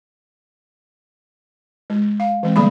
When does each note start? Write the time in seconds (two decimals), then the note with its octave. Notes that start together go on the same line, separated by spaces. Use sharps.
1.90 G#3
2.20 F5
2.43 E3 G#3 C4
2.56 D3 G3 A3 A#3 D5 B5